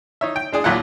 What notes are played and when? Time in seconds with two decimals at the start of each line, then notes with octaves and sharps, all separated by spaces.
0.21 D#4 C#5 E5
0.36 G5
0.52 G#3 D4 G#4
0.64 A#1 D#2 A#2 F#3 F4 F#5